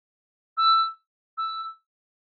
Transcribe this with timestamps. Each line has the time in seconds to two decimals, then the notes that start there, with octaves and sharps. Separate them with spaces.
0.57 E6
1.38 E6